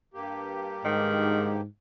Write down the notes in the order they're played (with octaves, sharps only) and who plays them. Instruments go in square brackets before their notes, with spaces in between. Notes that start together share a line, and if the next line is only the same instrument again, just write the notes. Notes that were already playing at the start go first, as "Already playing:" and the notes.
[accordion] G2 A#3 G4
[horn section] G#2 [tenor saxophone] D#3